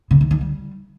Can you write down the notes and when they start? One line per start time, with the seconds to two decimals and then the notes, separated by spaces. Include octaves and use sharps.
0.11 C#3
0.21 D#3
0.31 D#3
0.41 G3